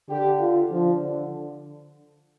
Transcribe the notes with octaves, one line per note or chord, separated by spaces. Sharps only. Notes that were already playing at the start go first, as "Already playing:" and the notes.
D3 G4
F4
F3 D4
D3